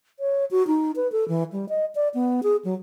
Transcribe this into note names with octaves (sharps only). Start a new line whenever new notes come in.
C#5
F#4
D#4
B4
A4
E3
G3
D#5
D5
B3
G#4
F#3